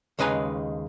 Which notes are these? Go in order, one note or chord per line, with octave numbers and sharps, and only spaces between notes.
D#2 C#3 G#3 B4 G#5 A#5